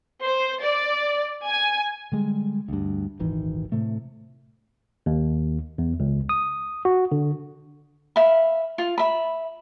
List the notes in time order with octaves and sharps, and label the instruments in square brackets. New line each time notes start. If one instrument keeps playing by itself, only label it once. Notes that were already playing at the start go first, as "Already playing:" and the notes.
[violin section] C5
D5
G#5
[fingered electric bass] D3 G3 G#3
D2 G2
D#1 G#1 D#3 E3
A2 C3 A3
[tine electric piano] D#2
E2
C#2
D#6
F#4
D3
[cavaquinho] E5 F5 B5
F4
E5 B5